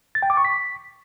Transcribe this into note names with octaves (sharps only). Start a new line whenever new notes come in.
A6
G5
D6
C#6
B6